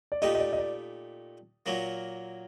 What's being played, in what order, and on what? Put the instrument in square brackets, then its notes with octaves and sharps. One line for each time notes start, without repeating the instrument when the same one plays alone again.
[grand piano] D5
[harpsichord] A#2 A3 D#4 G4 [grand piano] D#5
[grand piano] D#5
D5
D#5
D5
[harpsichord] A#2 F#3 A#3